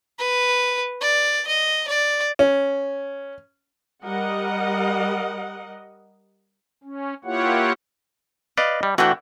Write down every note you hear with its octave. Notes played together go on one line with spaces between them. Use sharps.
B4
D5
D#5
D5
C#4
G3 A#4 D#5 F#5
C#4
A#3 E4 F4 G4 C#5 F#5
B4 D5 D#5 F5
G3
E3 A3 D4 F#4 F#5 G5